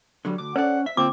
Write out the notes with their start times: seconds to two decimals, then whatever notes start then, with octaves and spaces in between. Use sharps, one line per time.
0.25 D3 F#3 G3
0.38 D2 D6
0.56 C#4 A4 C5 D5 F#5
0.86 E5 B6
0.97 D3 A#3 C4 F4 D6